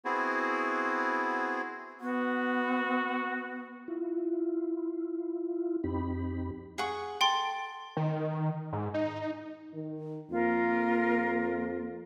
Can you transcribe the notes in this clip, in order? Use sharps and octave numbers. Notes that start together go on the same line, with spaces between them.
B3 C4 E4 F#4 G#4
B3 F#4
E4 F4
F2 C4 D#4 G4 B5
G#4 F#5 C#6
A4 G5 C6
D#3
G#2
D#4
D#3
F2 A#3 F4 A#4